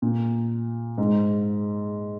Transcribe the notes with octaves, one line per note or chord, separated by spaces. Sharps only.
A#2
G#2